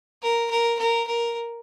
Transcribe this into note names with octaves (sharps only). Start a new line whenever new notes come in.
A#4
A#4
A#4
A#4